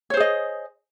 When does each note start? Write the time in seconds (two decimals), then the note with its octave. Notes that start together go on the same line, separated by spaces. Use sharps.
0.10 C#5
0.14 C5
0.17 G#4
0.20 D#5